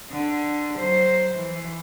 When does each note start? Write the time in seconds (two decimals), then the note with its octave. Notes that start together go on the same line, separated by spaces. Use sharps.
0.12 D3
0.79 F#3 C5
1.35 E3